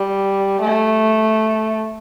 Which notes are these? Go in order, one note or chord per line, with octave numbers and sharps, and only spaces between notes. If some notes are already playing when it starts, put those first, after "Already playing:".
Already playing: G3
A3